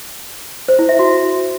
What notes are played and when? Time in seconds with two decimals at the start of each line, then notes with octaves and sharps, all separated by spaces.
0.68 C5
0.79 E4
0.89 E5
0.99 F#4